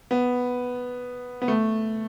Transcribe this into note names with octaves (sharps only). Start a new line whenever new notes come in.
B3
B3
A3